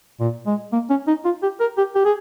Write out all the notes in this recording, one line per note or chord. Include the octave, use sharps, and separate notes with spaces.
A#2
G#3
A#3
C#4
D#4
F4
G4
A#4
G4
G4
G#4